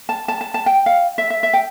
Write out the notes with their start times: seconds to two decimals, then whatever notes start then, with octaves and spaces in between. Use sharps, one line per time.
0.09 A5
0.28 A5
0.41 A5
0.54 A5
0.66 G5
0.86 F5
1.18 E5
1.30 E5
1.43 E5
1.53 G5